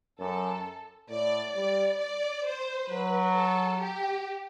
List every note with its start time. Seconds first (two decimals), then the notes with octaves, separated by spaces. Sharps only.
0.20 F#2 A4
1.10 A2 D5
1.56 G3 D5
2.00 D5
2.46 C5
2.90 F#3 B4
3.35 A4
3.80 G4